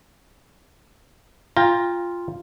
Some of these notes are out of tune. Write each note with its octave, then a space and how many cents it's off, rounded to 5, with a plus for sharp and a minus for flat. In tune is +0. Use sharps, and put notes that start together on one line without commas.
F4 -5 G5 +30 A#5 +10